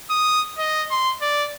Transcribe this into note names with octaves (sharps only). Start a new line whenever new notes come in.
D#6
D#5
C6
D5